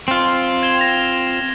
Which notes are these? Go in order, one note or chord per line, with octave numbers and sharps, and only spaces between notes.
C4 F4
G#6 E7 G7
A#6 F7